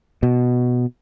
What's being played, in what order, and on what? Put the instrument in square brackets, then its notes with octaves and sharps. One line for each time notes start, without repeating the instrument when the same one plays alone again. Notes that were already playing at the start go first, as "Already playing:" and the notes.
[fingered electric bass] B2